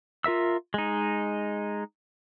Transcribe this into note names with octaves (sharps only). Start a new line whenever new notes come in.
F4 A#4 E5 E6
G#3 D#4